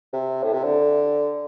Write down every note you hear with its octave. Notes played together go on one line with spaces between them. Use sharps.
C3
A2
C3
D3